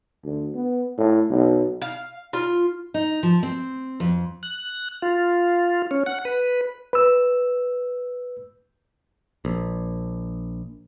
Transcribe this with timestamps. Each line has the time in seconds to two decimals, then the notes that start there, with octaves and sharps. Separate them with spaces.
0.24 D2
0.55 B3
0.98 A2
1.30 B1
1.82 F5
2.33 F4
2.94 D#4
3.23 F3
3.43 C4
4.00 F2
4.43 F#6
5.02 F4
5.91 C#4
6.06 F#5
6.25 B4
6.93 B4 E6
9.45 A#1